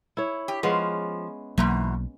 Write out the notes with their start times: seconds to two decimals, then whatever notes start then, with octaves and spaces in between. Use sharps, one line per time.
0.17 E4 C#5
0.48 G4
0.63 F3 G#3 B3 C#4
1.58 B1 E2 G#2 B2 F#3 A#3